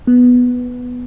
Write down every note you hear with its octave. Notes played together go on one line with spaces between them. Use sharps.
B3